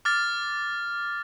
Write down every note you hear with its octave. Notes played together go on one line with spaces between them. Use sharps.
D6 F6 A6